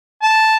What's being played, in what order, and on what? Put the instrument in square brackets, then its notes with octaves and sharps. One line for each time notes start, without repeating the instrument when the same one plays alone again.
[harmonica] A5